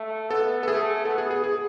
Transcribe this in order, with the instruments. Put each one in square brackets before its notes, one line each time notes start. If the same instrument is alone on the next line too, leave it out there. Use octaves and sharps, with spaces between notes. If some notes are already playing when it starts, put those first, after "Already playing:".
Already playing: [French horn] A3
[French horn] B3 [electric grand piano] A4
[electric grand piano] A4
[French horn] A3 [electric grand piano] G#4
[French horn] B3 [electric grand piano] A4
[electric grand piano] G#4
G#4
G#4